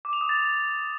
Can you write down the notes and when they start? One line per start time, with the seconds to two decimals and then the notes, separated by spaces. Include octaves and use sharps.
0.05 D6
0.13 F7
0.21 D#6
0.29 A6